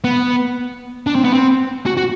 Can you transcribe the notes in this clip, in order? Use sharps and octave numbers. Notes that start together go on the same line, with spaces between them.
B3
D4
C4
B3
C4
F#4
F#4